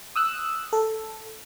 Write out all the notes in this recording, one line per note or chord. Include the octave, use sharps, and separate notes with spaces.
D#6 E6 F#6
A4